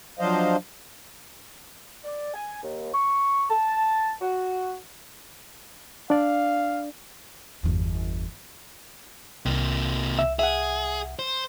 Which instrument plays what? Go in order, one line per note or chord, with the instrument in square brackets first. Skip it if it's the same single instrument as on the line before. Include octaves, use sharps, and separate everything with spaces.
[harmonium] F3 F#3 D4 C5 D#5 F5
[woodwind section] D5
G#5
D#2
C#6
A5
F#4
[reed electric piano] D4 D5 [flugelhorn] F5
[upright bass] G1 E2
[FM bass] C2 [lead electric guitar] C3 A#3
[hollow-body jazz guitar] E5
[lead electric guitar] G#4 [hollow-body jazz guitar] E5 F#5
[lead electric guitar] C5